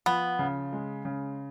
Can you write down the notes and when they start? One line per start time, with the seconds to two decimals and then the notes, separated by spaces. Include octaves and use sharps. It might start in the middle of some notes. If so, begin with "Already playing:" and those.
0.06 F3 B3
0.39 C#3
0.73 G#3
1.05 C#3